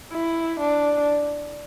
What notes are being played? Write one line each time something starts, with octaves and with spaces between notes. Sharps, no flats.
E4
D4